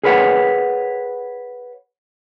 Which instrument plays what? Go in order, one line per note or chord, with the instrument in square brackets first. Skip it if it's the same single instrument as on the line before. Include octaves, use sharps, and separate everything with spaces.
[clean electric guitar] G#4 A#4 B4 C#5 F#5